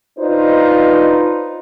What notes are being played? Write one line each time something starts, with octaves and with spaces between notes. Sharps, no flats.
D4 D#4 F4 B4 C5